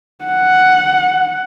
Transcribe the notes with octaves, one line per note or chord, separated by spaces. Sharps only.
F#5